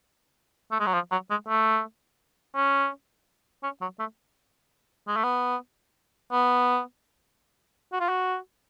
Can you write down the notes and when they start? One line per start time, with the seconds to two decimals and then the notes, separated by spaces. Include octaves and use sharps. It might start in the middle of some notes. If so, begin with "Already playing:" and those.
0.72 A3
0.80 G#3
0.87 F#3
0.94 F3
1.11 F#3
1.30 G#3
1.48 A3
2.55 C#4
3.63 C#4
3.81 F#3
3.99 A3
5.08 G#3
5.16 A3
5.24 B3
6.32 B3
7.93 F#4
8.00 F4
8.09 F#4